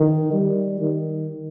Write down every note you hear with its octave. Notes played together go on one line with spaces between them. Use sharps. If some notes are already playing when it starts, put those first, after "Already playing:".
Already playing: D#3
G3
D#3